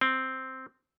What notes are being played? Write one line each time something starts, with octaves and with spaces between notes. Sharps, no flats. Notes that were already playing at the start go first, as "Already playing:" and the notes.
C4